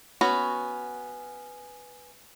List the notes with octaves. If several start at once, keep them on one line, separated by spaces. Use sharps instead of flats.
B3 C#4 F#4